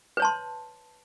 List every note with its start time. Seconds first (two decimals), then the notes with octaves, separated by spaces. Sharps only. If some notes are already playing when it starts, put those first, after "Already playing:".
0.17 B4
0.20 C#5
0.22 A5
0.25 C6